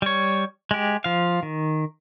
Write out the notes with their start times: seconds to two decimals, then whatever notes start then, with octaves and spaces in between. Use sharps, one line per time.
0.02 G3 C#5
0.71 G#3 G4
1.04 F3 F5
1.43 D#3